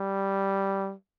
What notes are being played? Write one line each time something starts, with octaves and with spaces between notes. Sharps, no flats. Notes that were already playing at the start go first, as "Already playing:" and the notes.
Already playing: G3